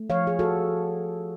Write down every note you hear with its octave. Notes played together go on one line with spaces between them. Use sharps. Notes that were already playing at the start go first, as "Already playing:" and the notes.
Already playing: A3
F3 C#5 F5
G#4
A3 F#4 A4